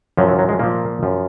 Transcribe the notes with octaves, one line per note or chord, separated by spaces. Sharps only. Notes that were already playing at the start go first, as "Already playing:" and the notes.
F#2 F3 F#3
F#3
F#3
G#3
A#2 F3 A#3
F#2 F3